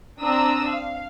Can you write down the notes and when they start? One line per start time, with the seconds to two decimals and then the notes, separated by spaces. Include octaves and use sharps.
0.21 C4 D4 A#5 D#6 E6
0.66 F5